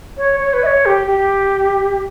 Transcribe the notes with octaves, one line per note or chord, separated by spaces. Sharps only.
C#5
C#5
B4
E5
C#5
G4
G4